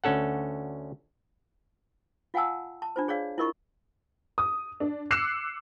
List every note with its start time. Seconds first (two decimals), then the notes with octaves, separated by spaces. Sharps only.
0.04 D2 C#4 A4 F#5
2.34 F4 F5 F#5 G#5 A5 E6
2.82 A5
2.96 D4 F4 C5
3.08 G#4 C#5 D5 F5
3.38 E4 F4 A#4 D#5 C#6
4.38 D#6
4.80 D4
5.11 D6 E6 F#6 C7 C#7 E7